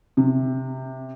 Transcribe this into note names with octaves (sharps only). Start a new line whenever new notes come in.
C3